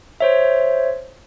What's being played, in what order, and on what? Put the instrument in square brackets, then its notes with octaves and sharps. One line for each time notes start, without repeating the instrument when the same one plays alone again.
[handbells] C5 C#5 E5